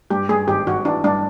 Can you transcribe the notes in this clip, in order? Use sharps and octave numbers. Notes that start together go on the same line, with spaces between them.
G2 G4
G2 G#4
G#1 G4
G#1 F#4
E3 D4
G2 D4